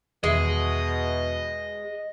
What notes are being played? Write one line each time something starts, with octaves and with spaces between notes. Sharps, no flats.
E2 B2 D#3 G#3 D#5 E5